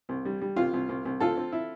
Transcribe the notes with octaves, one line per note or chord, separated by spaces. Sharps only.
C2
G3
G3
C2 F4
C2
C2
C2
C4 F4 A4
C4
E4